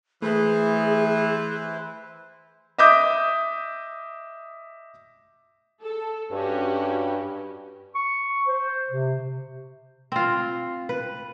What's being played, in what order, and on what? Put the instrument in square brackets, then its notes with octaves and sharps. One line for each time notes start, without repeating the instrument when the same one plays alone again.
[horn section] E3 [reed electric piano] A3 [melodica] E4 B4 C5 [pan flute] G#4
[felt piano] D#5 E5 D6 D#6 G6
[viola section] A4
[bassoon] G2 [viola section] C#4 F#4 G4
[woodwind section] C#6
C5
C3
[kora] C4 F4
B4